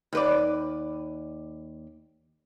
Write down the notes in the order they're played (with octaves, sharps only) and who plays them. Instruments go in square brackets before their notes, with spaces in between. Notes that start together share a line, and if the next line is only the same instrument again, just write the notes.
[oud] D#2 B4 D5